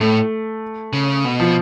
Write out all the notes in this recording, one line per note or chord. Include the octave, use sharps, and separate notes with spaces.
A2 A3
C#3
B2
F3